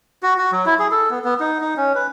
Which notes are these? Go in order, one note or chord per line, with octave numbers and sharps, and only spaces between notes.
F#4
F#4
F#3
E4
G#4
A4
B3
B3
D#4
D#4
C#4
B4